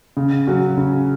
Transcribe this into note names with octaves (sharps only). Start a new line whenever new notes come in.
C#3
F#3 C#4 F#4
C#3